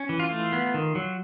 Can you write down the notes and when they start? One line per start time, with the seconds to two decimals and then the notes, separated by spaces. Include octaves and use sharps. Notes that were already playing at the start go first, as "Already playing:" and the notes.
Already playing: C#4
0.09 E3
0.20 F4
0.30 A3
0.53 B3
0.74 D#3
0.95 F#3